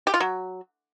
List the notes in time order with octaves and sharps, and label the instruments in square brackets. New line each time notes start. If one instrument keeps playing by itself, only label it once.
[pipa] G4
F4
F#3